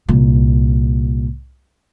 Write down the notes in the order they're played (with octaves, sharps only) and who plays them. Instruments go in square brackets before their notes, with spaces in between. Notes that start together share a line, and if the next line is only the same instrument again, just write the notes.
[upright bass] C2 A#2